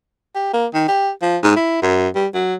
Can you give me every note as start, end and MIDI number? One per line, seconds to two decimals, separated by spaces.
0.35 0.49 67
0.54 0.66 58
0.74 0.86 51
0.88 1.11 67
1.22 1.38 53
1.43 1.55 44
1.56 1.79 64
1.82 2.08 42
2.15 2.27 55
2.34 2.55 54